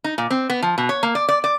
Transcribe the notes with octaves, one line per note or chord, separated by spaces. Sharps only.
D#4
A#2
C4
B3
F3
B2
C#5
A#3
D5
D5
D5